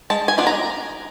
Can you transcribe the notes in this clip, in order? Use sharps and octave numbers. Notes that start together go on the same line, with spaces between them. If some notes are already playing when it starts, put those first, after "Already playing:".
G#3 A5
G#5
B3 D4 F4
A#5